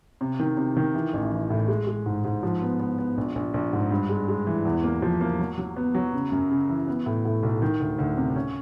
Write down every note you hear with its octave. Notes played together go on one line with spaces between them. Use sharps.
C3
D#3
C3
D#3
E3
A1
E3
A2
G#3
G#3
G#2
G#2
F3
B3
B3
B3
A#1
A#1
A#1
G#2
G2
G#3
G#3
E3
E2
A#3
F3
A#3
F#3
F#3
B3
F#3
C#3
F#2
C#3
E3
B3
A2
A2
B1
D#3
D2
D2
C3
C#4